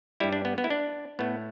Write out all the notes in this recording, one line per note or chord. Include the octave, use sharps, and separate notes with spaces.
G2 G3 E4
D4
B3
B3
E4
D4
A2 A3 B3